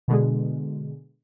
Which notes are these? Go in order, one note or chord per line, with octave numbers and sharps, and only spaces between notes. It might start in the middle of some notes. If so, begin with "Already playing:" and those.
B2 D3 G#3